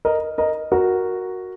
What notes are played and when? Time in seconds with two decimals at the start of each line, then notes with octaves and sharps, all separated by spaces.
0.05 A#4 D#5
0.38 A#4 D#5
0.72 F#4 A#4